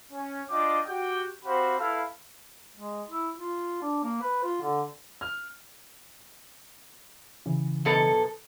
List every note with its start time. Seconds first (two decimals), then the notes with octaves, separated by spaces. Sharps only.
0.11 C#4
0.50 D4 F4 D5 D#5 G5 D6
0.86 F#4 G4 G5
1.45 C4 F#4 G4 C5 F5 B5
1.79 E4 A4 B4 F5
2.76 G#3
3.08 E4
3.38 F4
3.82 D4
4.03 A#3
4.21 B4
4.44 F4
4.61 D3
5.21 F6
7.46 C#3 E3
7.85 F#2 B2 A4